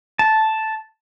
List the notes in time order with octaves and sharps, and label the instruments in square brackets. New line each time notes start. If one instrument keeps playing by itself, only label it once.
[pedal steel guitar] A5